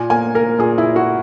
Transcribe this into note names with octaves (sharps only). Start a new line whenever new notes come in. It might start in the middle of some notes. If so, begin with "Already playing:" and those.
Already playing: A#2 G#5
A#3 G#5
A#3 A#4
A#2 G#4
E4
A#2
F#4